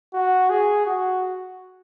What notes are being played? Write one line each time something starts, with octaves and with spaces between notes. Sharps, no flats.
F#4
G#4
F#4